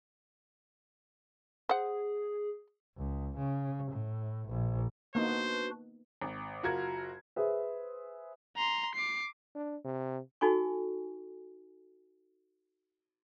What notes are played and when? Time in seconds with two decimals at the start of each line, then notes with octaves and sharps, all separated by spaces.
1.69 G#4 C5 F#5
2.97 C#2
3.38 C#3
3.92 A2
4.49 A#1
5.15 A#3 B3 D4 D#4 F#4 B4 C5
6.22 G#1
6.63 F#1 F4 F#4 A#4 G#6
7.36 G#4 B4 C5 E5
8.56 A#5 C6
8.95 D6 C7
9.55 D4
9.85 C3
10.41 D#4 F#4 A4 G#5 C#6